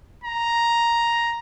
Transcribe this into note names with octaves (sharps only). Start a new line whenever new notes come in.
A#5